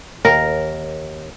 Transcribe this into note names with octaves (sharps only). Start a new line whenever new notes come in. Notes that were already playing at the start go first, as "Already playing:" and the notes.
D#2 A#4